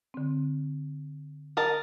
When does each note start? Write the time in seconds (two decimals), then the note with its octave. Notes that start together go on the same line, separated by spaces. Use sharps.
0.14 D3 C4
1.57 A#4 D#5 A5